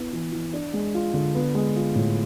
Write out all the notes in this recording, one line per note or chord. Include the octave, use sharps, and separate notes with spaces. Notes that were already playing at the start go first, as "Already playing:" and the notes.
Already playing: B3 E4
E3
E3
D4
G#3
F4
D3
B3
G#3
F4
A2